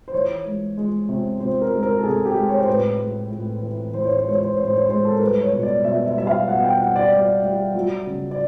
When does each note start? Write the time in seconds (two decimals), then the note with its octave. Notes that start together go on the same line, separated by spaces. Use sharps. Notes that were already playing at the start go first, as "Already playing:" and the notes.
0.08 C5
0.14 E3 C#5
0.46 G#3
0.77 G#3
1.09 C3
1.40 C3 C5
1.62 A#4
1.72 G#3
1.83 A#4
1.99 A4
2.03 C3 G#4
2.25 G4
2.35 G#3
2.49 C#5
2.58 C5
2.67 A2 B4
2.99 G#3
3.31 A2
3.63 E3
3.94 E3 C5
4.05 C#5
4.17 C5
4.26 G#3 C#5
4.40 C5
4.52 C#5
4.58 A2
4.63 C5
4.74 C#5
4.86 G#3 C5
5.05 A4
5.13 A#4
5.21 G3 B4
5.42 C#5
5.53 B2
5.63 D5
5.84 B2 E5
6.06 E5
6.16 G3 E5
6.27 F5
6.48 B2 F#5
6.64 G5
6.80 G3 F#5
6.96 D5
7.11 G3 D5
7.43 G3
7.74 F#3
8.07 C#3
8.31 D5